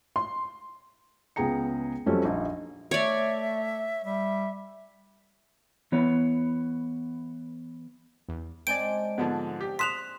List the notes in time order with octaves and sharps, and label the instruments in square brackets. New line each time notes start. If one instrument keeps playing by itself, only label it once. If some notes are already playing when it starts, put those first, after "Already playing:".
[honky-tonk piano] C6
[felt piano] C#2 B3 G#4 G5 A#5 C#7
F2 F#3 G3 A3 C4 C#4
A#1 D#4
[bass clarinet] A3 [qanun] C#5 D5 [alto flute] E5
[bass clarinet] G3 [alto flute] E5
[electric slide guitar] E3 B3 C#5
[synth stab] E2
[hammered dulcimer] G#3 C4 D4 [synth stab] D5 G#5 G6 [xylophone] D7
[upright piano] G#2 D3 F3 [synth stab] B3
[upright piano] G4
[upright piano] C6 D#6 F#6 [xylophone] B6 E7 F7